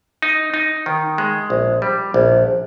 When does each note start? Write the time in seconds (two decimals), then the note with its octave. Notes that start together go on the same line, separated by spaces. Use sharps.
0.22 D#4
0.54 D#4
0.86 D#3
1.18 G#3
1.50 A#1
1.82 G3
2.14 A#1